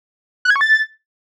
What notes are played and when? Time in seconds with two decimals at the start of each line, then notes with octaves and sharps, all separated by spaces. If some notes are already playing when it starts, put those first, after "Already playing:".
0.45 F#6
0.50 G#6
0.56 C#6
0.61 A6